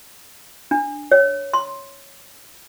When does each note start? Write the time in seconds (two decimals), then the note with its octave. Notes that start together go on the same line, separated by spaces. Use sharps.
0.71 D4
1.12 C#5
1.54 C6